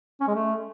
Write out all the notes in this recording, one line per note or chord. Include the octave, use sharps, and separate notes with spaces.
C#4
G#3
A3